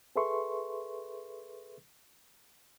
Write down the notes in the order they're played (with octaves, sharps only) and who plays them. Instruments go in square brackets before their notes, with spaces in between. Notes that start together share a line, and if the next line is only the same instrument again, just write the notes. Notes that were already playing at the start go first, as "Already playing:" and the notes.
[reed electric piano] G#4 A4 B4 E5 C6 C#6